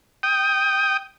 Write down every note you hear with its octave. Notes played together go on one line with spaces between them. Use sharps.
G5 D#6